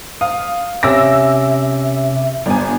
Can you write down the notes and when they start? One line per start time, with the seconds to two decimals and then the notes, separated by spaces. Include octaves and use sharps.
0.21 F5 D#6
0.83 C3 C#4 E5 D6 E6 A#6
2.46 G1 G#5